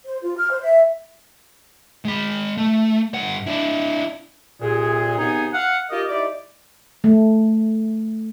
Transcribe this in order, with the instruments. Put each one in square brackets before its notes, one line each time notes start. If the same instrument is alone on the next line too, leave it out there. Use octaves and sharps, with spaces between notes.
[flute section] C5
F4
F6
C5
E5
[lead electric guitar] G#3 B5
A3
G2 F#5
D4 E4
[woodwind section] C2 A#2 G#4
D#2 C3 B3 D#4 G#4 G#5
F5 F#5
D#4 F4 G4 A#4 D#5
D#4 E4 G4 D5
[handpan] A3